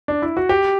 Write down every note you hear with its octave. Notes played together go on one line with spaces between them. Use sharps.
D4
E4
F#4
G4